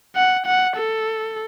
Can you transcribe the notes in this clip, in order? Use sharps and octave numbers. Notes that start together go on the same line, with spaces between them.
F#5
F#5
A4